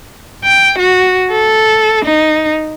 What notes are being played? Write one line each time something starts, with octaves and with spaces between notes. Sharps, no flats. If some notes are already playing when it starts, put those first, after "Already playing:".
G5
F#4
A4
D#4